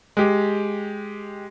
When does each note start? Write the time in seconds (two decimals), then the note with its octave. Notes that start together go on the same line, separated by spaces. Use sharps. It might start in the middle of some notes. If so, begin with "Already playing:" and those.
0.17 G#3 G4